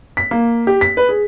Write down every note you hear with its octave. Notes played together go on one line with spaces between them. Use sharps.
B6
A#3
G4
B6
B4
G#4